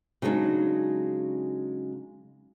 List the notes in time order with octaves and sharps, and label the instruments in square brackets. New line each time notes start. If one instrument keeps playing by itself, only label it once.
[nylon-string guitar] C#3 F#3 G#3 D4 D#4